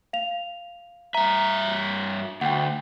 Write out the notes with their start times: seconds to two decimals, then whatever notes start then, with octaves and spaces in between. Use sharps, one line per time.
0.13 F5 F7
1.14 G2 E5 A#5
2.41 D2 F#5 G5